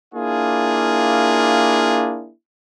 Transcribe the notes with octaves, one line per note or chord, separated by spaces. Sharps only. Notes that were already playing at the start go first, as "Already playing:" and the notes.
A#3 D4 E4 F4 G#4